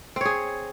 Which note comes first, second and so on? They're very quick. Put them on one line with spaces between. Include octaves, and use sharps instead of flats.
C4 C#5 G#4